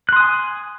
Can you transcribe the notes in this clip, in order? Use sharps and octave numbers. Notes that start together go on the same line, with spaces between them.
G#5 C6 D#6 F#6